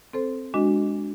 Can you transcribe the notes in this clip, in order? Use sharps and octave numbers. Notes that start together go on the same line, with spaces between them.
C4 A4 C5
G#3 D4 F#4 D#5